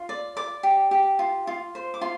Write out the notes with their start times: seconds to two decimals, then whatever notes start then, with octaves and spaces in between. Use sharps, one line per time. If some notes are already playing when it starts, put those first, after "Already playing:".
Already playing: F4
0.09 D5
0.37 D5 D6
0.63 G4
0.91 G4
1.19 F4
1.47 F4
1.75 C5
1.94 D6
2.01 F4 C6